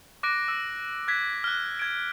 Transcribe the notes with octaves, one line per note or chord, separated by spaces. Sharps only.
D6 F#6 A#6 D7
E6
F#6 G#6 B6
F6 F#6
G#6 D7